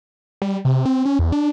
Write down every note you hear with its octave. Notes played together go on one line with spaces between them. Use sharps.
G3
C3
C4
C#4
E2
D4